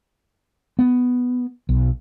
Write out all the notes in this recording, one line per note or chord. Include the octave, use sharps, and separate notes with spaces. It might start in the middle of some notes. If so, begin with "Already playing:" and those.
B3
B1